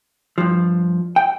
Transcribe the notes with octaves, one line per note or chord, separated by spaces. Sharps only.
G2 F3
G5